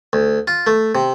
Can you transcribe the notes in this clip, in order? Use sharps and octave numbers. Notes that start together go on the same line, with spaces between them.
D2
F4
A3
C3